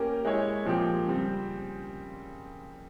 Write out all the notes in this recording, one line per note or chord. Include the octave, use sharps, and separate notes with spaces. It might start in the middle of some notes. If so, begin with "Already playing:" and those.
Already playing: A#3 C#4 G4 A#4
G#3 E4 G#4 C#5
A#2 F3 C4 G4
C#3 G3 C4